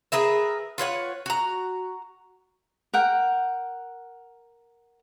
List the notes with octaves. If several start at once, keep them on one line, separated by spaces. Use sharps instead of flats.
G#4 A#4 B4 E5
F4 B4 C#5 F#5
F#4 A#5
A#4 F#5 G5